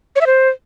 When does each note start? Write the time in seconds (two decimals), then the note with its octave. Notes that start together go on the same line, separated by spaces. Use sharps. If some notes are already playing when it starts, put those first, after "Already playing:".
0.16 C#5
0.21 E5
0.26 C5